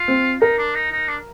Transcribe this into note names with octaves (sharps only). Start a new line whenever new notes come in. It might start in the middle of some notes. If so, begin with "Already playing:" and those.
Already playing: F4
C4
D#4 A#4
D4
D#4
D#4
D4